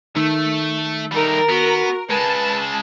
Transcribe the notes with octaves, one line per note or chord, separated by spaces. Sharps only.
D#3 A3
G3 A3 D#4 A#4
B3 F#4
C#3 G#3 B4 A5